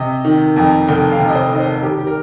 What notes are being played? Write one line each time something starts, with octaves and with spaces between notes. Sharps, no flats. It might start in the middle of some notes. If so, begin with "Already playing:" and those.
Already playing: C3 D#5
D#3
F2
F1 G5
F5
C3
D#5
C5
D#3 D#5
C5
D#3 G4
G4
A#4